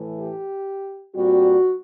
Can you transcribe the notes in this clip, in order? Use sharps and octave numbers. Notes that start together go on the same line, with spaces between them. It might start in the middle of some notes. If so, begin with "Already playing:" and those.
Already playing: A2 E3 A3
G4
A#2 G3 C4 F#4